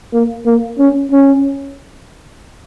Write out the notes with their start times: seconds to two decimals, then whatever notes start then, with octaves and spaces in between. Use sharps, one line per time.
0.13 A#3
0.46 A#3
0.79 C#4
1.12 C#4